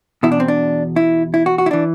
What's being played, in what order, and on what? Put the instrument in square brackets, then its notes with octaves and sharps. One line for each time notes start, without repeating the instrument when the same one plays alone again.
[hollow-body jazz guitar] E2 B2 E4
D4
C4
D4
E4
E4
F#4
F#4
E4
E3 D4